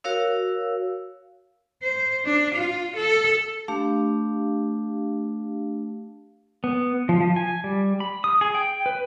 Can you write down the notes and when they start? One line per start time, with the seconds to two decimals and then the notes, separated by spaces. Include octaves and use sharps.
0.04 F#4 A#4 C#5 F5 E6
1.82 C5
2.25 D4
2.55 F4
2.96 A4
3.68 A3 D4 G4 F5
6.64 B3
7.09 F3
7.20 F3
7.36 G#5
7.64 G3
8.00 B5
8.24 D#6
8.41 G#4
8.55 G5
8.86 B4